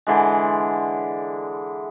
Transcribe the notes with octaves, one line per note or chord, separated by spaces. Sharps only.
D3 E3 G#3